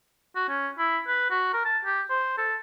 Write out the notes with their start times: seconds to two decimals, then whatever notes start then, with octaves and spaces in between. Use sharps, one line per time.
0.36 F#4
0.48 C#4
0.78 E4
1.07 B4
1.30 F#4
1.53 A#4
1.65 A5
1.85 G4
2.10 C5
2.37 A4